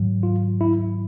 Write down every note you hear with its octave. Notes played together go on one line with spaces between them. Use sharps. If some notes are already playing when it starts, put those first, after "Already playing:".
Already playing: G#2 D#3 F#3
F4
E4